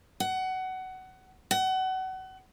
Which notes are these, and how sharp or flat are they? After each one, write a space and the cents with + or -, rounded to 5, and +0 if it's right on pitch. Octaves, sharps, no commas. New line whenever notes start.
F#5 +20
F#5 +30